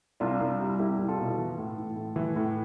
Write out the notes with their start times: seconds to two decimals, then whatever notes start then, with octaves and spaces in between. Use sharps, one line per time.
0.20 C2 D4 F4
0.40 C2
0.60 G3
0.79 C2 E4 G4
0.98 C2
1.08 F4 A4
1.18 B2
1.38 E3
1.58 A2
1.77 A2
1.96 A2
2.16 E3
2.36 A2